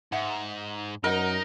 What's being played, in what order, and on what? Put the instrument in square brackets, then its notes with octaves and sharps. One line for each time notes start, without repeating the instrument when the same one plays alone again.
[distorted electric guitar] G#2 [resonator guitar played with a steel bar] E5 F#5
[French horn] F#2 [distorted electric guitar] D#4 [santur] A#4 [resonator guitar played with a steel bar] C5 D#5 F#5